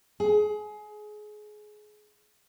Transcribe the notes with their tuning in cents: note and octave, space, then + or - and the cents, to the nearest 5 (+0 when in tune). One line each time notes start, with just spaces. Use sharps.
G#4 +25